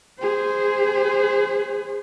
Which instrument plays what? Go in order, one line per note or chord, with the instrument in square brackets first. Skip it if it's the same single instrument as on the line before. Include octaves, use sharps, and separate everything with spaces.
[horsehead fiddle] G#4 C5